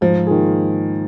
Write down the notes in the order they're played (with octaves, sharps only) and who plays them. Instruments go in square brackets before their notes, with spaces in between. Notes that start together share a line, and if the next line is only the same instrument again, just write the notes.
[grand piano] G#2 [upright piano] F3
[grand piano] D#3 A#3 F4 G#4